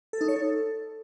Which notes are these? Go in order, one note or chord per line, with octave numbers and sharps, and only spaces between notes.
A4
D#4
C#5
A4